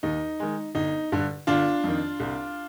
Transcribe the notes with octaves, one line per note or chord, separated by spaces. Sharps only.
D#2 D#4
D#3 G#3
G1 D#4
G2 D3
G1 D4 F4
F2 D#3
C2